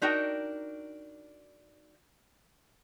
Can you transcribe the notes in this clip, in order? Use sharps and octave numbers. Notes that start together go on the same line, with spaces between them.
D4 D#4 F#4 A#4 G5